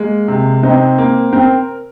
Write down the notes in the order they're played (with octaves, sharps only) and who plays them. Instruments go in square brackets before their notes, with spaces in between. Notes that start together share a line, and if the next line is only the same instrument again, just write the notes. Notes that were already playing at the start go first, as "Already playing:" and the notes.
Already playing: [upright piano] G#3 [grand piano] A#3
[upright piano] C3
[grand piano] C4 [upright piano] D#4
[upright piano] A#3
[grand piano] C4 [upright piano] A#4